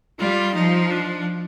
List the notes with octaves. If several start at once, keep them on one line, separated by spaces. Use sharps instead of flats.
G3 F4
F3 D#4
D4